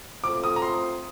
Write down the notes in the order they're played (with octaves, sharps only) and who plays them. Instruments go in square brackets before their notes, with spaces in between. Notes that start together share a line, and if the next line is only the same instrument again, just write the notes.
[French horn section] A3 C4 F4 A4 C5 [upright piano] D6
[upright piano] D#6
A#5
C6